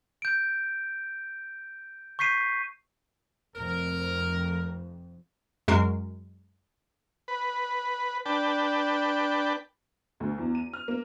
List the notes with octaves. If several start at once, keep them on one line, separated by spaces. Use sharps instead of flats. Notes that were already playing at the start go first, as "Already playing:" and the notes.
G6 D7
C#6 G6 B6 C7 D#7
F1 F2 A#4
F#2 G#3 F#4 A#4 C7
B4
D4 B4 G5 A5
D2
E2
D#7
F6
A#3